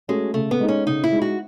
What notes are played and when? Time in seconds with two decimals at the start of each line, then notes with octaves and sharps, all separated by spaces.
0.08 G#3 A3 C#4 F#4
0.34 C#3 A3
0.51 B3
0.60 G#3 D#4
0.68 C#4
0.86 C#3 D#4
1.04 E4
1.12 G#3 D#4
1.22 F#4